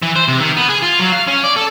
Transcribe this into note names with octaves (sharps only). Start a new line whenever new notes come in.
E3
C5
C3
D#3
B3
G#4
F4
F#3
F5
C#4
D5
A4